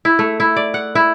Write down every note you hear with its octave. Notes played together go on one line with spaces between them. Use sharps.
E4
A3
E4
D5
F#5
E4